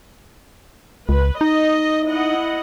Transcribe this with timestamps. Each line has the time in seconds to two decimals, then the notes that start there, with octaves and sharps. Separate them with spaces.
1.09 C#2 B4
1.41 D#4 D#5
2.06 E4 D#5 F#5